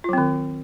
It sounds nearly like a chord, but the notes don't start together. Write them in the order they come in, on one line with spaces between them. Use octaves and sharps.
F4 F#3 C4 D#3